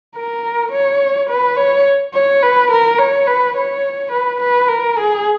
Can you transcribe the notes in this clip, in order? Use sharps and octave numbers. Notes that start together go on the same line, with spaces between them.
A#4
C#5
B4
C#5
C#5
B4
A#4
C#5
B4
C#5
B4
B4
A#4
G#4